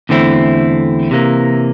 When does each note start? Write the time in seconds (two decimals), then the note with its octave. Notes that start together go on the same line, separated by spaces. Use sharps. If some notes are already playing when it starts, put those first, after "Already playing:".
0.09 E2 D3 A3 C4 E4
1.11 C3 E3 A#3